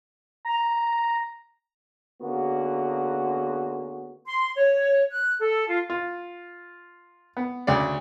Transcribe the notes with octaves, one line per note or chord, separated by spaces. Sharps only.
A#5
D3 A#3 B3 C#4 F#4 G#4
C6
C#5
F#6
A4
F4
F4
B3
D2 C#3 D5